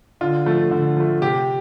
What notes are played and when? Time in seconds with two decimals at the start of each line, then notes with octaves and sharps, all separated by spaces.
0.21 D3 F4
0.46 F3 A3
0.71 D3
0.97 F3 A3
1.22 C3 G4